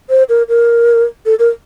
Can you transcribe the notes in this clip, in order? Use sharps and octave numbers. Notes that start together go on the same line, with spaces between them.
C5
A#4
A#4
A4
A#4